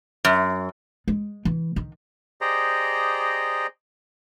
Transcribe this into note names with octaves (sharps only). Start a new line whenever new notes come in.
F#2
G#3
E3
D#3
G4 G#4 C5 D5 D#5 A#5